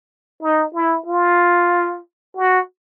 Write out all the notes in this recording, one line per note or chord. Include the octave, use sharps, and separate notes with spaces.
D#4
E4
F4
F#4